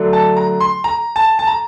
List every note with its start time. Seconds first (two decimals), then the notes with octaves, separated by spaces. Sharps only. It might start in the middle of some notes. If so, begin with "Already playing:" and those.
Already playing: D3 F#3 A3 D4
0.13 A5
0.37 A#5
0.61 C6
0.84 A#5
1.16 A5
1.39 A5
1.47 A#5